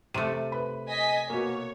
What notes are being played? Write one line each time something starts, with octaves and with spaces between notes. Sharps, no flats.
C3 A3 D#7
B4 B5
D#5 G#5 B6
B2 A#3 C#5